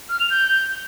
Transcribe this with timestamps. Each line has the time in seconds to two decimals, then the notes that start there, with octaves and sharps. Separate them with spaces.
0.09 F6
0.20 F7
0.30 G6